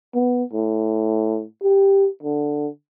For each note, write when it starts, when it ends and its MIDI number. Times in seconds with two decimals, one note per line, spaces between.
0.15 0.43 59
0.53 1.44 45
1.63 2.08 67
2.23 2.68 50